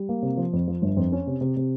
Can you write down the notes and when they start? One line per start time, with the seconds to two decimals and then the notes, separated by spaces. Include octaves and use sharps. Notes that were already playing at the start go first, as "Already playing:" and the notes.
Already playing: G3
0.09 A#3
0.22 C3
0.37 F3
0.53 F2
0.68 F3
0.82 G1
0.97 F2
1.12 C#4
1.27 C3
1.41 C3
1.57 C3